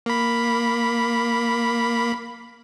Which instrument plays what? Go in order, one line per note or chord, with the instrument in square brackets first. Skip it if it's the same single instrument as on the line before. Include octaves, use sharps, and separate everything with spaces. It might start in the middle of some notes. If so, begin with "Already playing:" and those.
[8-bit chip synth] A#3 B5